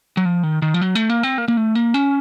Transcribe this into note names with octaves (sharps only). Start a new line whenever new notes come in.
F#3
F3
D#3
D#3
F3
F#3
A3
A#3
C4
A#3
A#3
A3
A#3
C#4